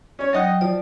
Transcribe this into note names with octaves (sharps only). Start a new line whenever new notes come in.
C#4 C#5
F#3 D#4 D#5 F#5 G5
F3 D5